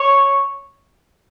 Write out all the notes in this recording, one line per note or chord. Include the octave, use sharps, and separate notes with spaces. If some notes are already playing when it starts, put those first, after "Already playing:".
Already playing: C#5